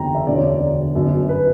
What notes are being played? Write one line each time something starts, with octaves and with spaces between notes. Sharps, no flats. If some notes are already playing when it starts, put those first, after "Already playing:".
Already playing: F#1 E2 D3 G5 A#5
E5
E1 D2 D3 D5
C#5
D5
G1 F#2 D3
B4